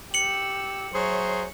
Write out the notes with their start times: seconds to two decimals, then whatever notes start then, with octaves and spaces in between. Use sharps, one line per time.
0.14 G4 E6 C#7 F#7
0.94 F#3 G#4 C5 C#5 E5